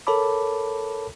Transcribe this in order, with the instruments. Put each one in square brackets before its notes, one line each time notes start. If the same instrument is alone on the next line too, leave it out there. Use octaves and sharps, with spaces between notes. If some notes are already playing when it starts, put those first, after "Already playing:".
[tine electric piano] A4 A#4 C#5 A5 B5 D6